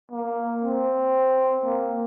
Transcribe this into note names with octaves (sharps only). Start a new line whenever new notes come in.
A#3
C4
A#3